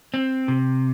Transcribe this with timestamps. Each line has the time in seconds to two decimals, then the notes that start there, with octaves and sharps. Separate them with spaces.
0.14 C4
0.48 C3